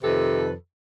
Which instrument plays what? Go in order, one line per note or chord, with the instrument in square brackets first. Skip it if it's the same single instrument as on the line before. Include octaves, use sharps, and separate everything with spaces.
[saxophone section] F2 C3 D#3 G4 A4 B4